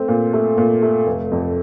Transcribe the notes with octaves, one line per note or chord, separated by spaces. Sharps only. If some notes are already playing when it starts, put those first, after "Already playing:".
Already playing: A3 C4
A#2
A3
A#2
A3
F1
F2